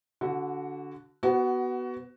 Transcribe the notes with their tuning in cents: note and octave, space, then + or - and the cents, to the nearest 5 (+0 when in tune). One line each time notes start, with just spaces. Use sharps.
D3 -20 F#4 +0
B3 +0 F#4 +20